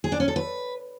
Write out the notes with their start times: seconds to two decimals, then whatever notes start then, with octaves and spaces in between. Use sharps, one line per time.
0.04 G#4
0.12 D4
0.20 C#4
0.28 A4
0.36 B4